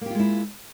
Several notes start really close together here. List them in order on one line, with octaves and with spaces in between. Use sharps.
A#3 G4 F4 G#3 E4